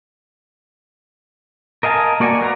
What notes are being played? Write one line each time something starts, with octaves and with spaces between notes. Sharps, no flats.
A#4 D#5 F5 G#5 A5
A#3 F#4 D5 F#5 G#5
A#4 B4 F5 A#5